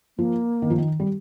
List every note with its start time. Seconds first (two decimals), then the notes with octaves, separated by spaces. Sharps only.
0.18 F3 A#3
0.62 D#3
0.70 F3
0.78 D#3
1.00 G3